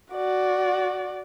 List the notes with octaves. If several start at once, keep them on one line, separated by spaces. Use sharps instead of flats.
F#4 D5